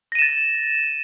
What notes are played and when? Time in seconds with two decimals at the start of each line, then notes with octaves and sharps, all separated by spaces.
0.12 A#6
0.15 D#7
0.19 E7
0.22 A6